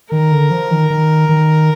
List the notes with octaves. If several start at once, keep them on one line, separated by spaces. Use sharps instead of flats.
D#3 A#4
D3
F3
D#3
D#3
D#3